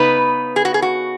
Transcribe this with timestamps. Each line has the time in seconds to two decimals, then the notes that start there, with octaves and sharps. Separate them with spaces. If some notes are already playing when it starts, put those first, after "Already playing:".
Already playing: C#3 B3 D#4 B4
0.56 G#4
0.65 F#4
0.74 G#4
0.82 F#4